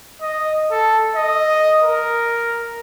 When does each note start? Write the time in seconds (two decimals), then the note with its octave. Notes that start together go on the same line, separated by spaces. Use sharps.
0.22 D#5
0.71 A4
1.16 D#5
1.84 A#4